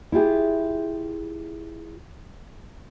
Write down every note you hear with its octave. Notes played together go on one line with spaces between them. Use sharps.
E4 F4 G4 G#4